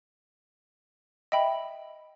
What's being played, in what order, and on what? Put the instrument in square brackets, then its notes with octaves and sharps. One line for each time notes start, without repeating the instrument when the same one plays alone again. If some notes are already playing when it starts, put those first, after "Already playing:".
[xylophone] D#5 E5 G5 B5